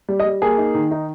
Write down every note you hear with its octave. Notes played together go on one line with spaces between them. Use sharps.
G3
D#5
G3
A#3 G#4
D#4
D#3
D#4